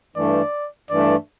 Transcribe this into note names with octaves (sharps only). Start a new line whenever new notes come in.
G2 E3 A3 D5
G2 E3 A3 D5